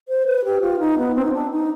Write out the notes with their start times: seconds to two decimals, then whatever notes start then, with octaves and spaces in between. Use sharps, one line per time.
0.08 C5
0.26 B4
0.45 G4
0.61 F4
0.79 D#4
0.98 B3
1.15 C4
1.24 D#4
1.33 D4
1.51 D#4